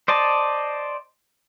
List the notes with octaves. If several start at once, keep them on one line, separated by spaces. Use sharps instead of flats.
C5 D5 D#5 A5